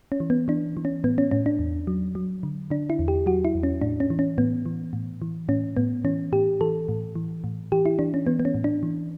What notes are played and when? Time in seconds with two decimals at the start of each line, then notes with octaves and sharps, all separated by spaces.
0.12 C#4
0.20 E3
0.30 B3
0.48 E3 D4
0.77 E3
0.85 C#4
1.04 A2 B3
1.18 C#4
1.31 A2 C#4
1.46 D4
1.59 E2
1.87 F#3
2.15 F#3
2.43 D3
2.70 D3 D4
2.90 E4
2.99 E2
3.08 G4
3.26 F#3 F#4
3.45 E4
3.55 E2
3.63 C#4
3.82 A2 D4
4.00 C#4
4.10 E3
4.19 C#4
4.38 A2 B3
4.66 E3
4.93 A2
5.22 E3
5.49 A2 C#4
5.77 A2 B3
6.05 E3 C#4
6.32 A2 G4
6.61 E3 A4
6.88 A2
7.15 E3
7.44 A2
7.72 E3 G4
7.86 E4
7.99 E3 D4
8.14 C#4
8.27 E3 B3
8.40 B3
8.45 C#4
8.54 A2
8.64 D4
8.83 E3